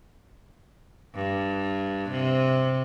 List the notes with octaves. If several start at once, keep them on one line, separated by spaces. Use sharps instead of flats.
G2
C3